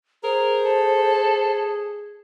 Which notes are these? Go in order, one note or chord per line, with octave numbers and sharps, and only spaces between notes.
G#4 A#4 C5
A4